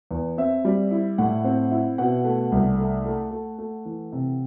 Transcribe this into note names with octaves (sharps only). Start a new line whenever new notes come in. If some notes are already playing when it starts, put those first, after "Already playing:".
E2
C4 E5
G3
E4
A2 F#5
C4
E4
B2 F#5
A3
C2
A3
A3
A3
A3
E3
C3